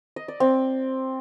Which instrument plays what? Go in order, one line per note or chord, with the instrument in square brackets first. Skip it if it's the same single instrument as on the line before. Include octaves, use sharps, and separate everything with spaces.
[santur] D#5
D5
C4